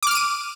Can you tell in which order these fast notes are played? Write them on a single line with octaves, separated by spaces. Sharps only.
D6 F6 D7 D#7